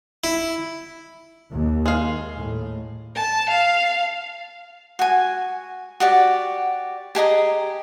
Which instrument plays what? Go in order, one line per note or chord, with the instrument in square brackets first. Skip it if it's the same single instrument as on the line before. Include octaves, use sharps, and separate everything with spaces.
[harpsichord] E4
[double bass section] D#2
[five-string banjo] G#3 F5
[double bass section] A2
[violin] A5
F5
[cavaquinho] F#4 G#5
F#4 G4 D5
G4 G#4 D#5 A#5